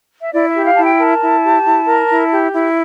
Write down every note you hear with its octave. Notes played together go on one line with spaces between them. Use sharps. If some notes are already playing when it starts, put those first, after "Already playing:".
E5
E4 D5
E5
G4
F5
E4 A5
G5
A#4 A5
E4
G4
E4
A#4
E4
G4
E4